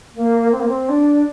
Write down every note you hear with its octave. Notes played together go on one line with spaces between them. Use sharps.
A#3
C4
A#3
C4
D4